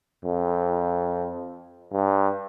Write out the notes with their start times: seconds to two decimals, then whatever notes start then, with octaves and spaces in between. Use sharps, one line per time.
0.25 F2
1.93 G2